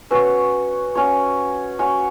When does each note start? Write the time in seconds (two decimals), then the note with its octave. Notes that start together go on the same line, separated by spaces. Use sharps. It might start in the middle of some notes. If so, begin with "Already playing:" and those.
0.11 C#4 F#4 B4 C#5
0.95 C#4 F#4 C#5
1.79 C#4 F#4 C#5